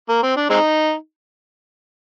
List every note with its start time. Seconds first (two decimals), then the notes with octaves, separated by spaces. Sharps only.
0.09 A#3
0.23 C4
0.37 D4
0.50 G#3 C4 D#4